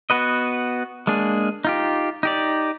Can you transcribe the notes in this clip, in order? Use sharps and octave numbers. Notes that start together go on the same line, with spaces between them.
B3 F#4 B4 D#5
G#3 A#3 D4 G#4
D#4 F4 G4
D#4 G4 D5